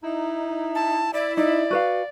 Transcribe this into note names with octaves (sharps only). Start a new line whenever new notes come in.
D#4 E4
A5
E4 D5
D#4 D5
F#4 B4 F5